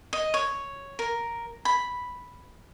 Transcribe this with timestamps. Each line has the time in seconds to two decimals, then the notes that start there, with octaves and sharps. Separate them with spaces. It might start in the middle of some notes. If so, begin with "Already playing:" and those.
0.13 D#5
0.34 C#5
0.99 A#4
1.65 B5